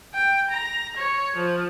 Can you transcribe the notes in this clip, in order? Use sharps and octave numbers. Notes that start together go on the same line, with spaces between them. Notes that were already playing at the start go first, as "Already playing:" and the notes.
G5
A#5
C#5
F3